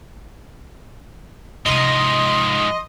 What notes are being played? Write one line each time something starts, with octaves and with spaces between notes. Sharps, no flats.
G#2 C3 F3 G#3 D#5 C6